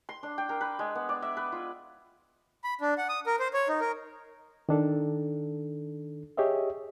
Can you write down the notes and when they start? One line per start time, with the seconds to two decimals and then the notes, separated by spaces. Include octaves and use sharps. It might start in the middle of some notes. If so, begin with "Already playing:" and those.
0.09 C6
0.23 D4
0.38 G5
0.49 A#4
0.61 B4
0.79 G#3
0.95 B3
1.09 D5
1.22 E5
1.37 B4
1.52 F4
2.64 B5
2.81 D4
2.98 F#5
3.09 D#6
3.26 A#4
3.39 C5
3.53 C#5
3.68 D#4
3.80 A#4
4.69 D#3 D4 A4
6.37 G4 G#4 C#5 D#5 E5